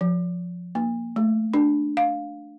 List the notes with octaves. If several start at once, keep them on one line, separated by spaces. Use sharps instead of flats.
F3
A#3
A3
D4
F5